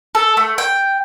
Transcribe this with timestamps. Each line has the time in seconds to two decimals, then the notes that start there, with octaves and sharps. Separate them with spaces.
0.15 A4
0.37 A3
0.58 G5